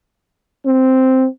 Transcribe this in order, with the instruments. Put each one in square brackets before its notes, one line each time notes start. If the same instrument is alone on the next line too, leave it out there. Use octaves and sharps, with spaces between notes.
[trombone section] C4